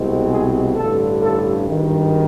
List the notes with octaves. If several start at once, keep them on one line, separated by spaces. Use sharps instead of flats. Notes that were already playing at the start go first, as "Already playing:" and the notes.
Already playing: C2 B2 G#3 C4
G#4
A1 G2 D3 A4
A4
G#1 G2 D#3